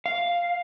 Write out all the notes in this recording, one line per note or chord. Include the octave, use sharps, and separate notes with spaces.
F5